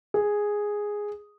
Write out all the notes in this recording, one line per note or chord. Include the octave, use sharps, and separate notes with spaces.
G#4